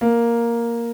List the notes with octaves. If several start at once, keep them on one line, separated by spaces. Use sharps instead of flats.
A#3